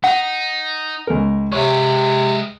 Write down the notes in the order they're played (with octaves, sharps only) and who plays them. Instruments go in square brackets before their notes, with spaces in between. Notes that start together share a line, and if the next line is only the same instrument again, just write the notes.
[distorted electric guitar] D#4 [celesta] F#5
[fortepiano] C#2 A#4
[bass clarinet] C3 [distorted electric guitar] G#3 B4 [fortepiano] C#5